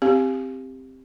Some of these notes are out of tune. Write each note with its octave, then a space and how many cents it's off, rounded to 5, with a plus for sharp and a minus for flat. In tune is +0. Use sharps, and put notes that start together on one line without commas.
C4 +0 G4 +10 F5 +0